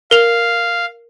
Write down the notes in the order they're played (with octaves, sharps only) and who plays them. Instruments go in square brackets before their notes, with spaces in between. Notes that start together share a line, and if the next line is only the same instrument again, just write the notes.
[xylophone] A#4 F7 [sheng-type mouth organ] F5